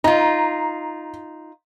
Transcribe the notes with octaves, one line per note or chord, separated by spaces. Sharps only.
D#4 F4 A#5